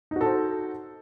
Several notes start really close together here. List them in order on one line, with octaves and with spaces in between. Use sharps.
D#4 F#4 A4 C5